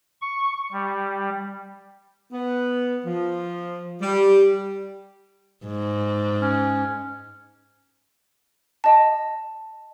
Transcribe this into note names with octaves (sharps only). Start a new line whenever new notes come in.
C#6
G3
B3
F3
G3
G#2
C#4
D#5 A5